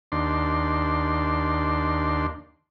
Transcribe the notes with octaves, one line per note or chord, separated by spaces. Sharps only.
D#2 D4 C6